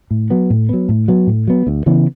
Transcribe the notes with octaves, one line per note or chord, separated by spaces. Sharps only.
A2
F#3 B3
A2
F#3 B3
A2
F#3 B3
A2
F#3 B3
D2
C#3 E3 B3